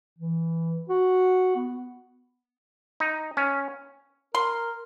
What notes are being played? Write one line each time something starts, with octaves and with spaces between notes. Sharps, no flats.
E3
F#4
B3
D#4
C#4
A#4 C6